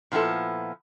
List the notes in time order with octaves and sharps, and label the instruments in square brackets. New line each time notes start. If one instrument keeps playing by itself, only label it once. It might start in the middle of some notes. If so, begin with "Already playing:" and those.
[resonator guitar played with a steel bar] A#2 F3 B3 E4 A4